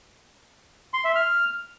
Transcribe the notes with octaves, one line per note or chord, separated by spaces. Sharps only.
C6
E5
F6